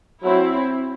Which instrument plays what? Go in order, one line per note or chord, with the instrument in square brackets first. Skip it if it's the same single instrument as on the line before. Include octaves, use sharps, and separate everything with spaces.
[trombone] F#3 [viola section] C4 E4